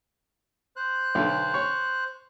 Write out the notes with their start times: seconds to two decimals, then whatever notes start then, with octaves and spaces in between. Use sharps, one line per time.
0.76 C5 F#6
1.15 B1 D3
1.54 C#5